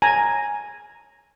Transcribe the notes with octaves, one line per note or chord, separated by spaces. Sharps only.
G#5 A#5